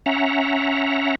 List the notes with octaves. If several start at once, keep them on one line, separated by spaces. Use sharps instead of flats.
C#4 E5 F#5 A#5